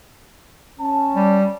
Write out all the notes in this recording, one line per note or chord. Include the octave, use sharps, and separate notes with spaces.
C#4 A5
G3